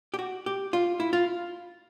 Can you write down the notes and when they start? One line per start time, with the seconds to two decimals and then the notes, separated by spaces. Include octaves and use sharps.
0.14 G4
0.19 F#4
0.46 G4
0.73 F4
1.00 E4
1.13 F4